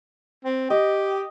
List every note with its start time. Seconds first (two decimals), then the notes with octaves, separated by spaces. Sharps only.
0.45 C4
0.70 G4 D#5